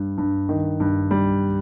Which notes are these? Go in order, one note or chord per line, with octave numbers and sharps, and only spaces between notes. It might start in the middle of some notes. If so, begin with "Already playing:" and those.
Already playing: G2 G3
G2
D#3
G2
G3